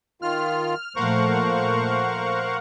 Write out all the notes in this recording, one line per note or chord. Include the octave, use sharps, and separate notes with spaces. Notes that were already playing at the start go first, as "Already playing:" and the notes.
D#3 F4 F6
A#2 F3 A3 A#4 C5 F5 F#5 C#6